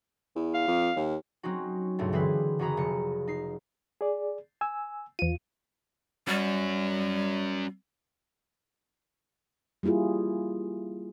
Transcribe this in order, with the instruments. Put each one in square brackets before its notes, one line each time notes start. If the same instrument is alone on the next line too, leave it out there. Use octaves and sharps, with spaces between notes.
[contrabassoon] E2
[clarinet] F5
[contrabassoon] F2
D#2
[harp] F#3 C4 C#4 D#4 F#4
C#2 G2 B2 A3
D3 E3 C4 G#4 B4
F#1 F#4 G#4 A#5 B5
F1 C#7
D#4 C7
[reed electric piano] G#4 D5
G#5 E6
[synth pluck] E2 D#7 [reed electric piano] F4
[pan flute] G3 [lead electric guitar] C#4 F#4
[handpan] G3 A#3 E4 F4 G#4